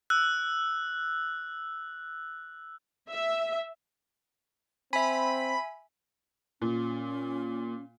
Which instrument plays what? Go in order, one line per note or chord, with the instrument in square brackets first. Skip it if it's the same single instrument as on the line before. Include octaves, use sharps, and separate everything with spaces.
[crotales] E6 F#6
[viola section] E5
[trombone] C4 [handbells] E5 G#5 [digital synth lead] B5
[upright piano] A#2 [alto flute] C#4